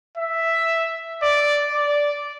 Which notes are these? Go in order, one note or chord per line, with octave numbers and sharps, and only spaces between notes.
E5
D5
D5